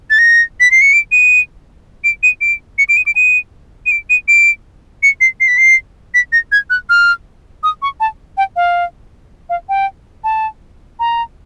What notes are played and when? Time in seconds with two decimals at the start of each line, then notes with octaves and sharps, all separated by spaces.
0.10 A6
0.19 A#6
0.60 B6
0.71 C7
0.81 C#7
0.93 D7
1.12 D#7
2.04 D7
2.23 D#7
2.41 D7
2.78 C#7
2.89 D7
2.97 D#7
3.06 D7
3.16 D#7
3.86 D#7
3.91 D7
4.10 D#7
4.28 D7
5.03 C#7
5.21 C7
5.40 C7
5.48 B6
5.58 C7
6.14 B6
6.33 A#6
6.52 G#6
6.70 F#6
6.89 F6
7.63 D#6
7.82 C#6
8.00 A5
8.37 G5
8.56 F5
9.50 F5
9.69 G5
10.24 A5
10.99 A#5